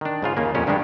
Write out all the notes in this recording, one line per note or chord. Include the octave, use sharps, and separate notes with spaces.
D#3 D4
G#2 C#3 F4
D#2 C#3 A#3
F2 A#2 C#4 G4
G2 D#3 G3 G#3 D4